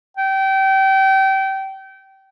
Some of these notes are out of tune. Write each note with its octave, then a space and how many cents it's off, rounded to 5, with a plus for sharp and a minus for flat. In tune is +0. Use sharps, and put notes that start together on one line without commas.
G5 -25